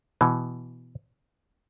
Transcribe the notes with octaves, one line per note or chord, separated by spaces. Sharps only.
B2 E3